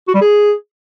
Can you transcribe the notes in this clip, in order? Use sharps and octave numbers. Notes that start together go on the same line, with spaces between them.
F#4
G3
G#4